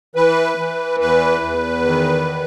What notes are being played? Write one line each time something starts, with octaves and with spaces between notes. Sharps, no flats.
E3 B4
E3
E2 B4
E2
D#3